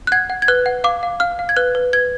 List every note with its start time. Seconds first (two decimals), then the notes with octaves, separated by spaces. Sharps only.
0.07 F#6
0.12 F#5 G#6
0.30 F#5
0.42 G#6
0.48 B4 F#6
0.66 F#5
0.84 F5 D6
1.03 F5
1.20 F5 F6
1.39 F5
1.49 G#6
1.57 B4 F#6
1.75 B4
1.93 B4 G#6